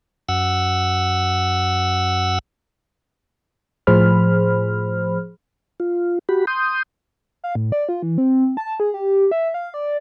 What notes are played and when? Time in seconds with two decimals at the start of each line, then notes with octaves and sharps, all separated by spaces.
0.29 F#2 F#5 E6
3.87 A2 F3 G#4 C5 B5 F6
5.80 F4
6.29 F#4 G4 B5
6.47 C6 D#6 G6
7.44 F5
7.55 A2
7.72 D5
7.89 F4
8.02 E3
8.18 C4
8.57 A5
8.80 G#4
8.94 G4
9.31 E5
9.54 F5
9.74 D5